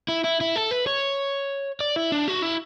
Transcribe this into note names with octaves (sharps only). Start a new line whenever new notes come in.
E4
E4
E4
A4
B4
C#5
D5
E4
D4
F#4
E4